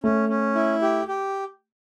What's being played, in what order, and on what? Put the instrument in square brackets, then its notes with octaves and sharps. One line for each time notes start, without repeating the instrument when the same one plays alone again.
[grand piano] A3 [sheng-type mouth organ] C#4
[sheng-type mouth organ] C#4
E4
G4
G4